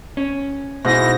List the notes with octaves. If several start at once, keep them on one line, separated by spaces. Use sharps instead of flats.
C#4
G#2 B2 E4 A#6